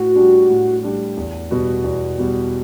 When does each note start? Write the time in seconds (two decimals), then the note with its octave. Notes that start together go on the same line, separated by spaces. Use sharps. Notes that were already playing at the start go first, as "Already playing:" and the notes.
Already playing: A2 F#4
0.15 G3 D4 G4
0.50 A2
0.83 G3 D4 G4
1.17 E2
1.51 B2 G3 B3 F#4
1.84 E2
2.18 B2 G3 B3 F#4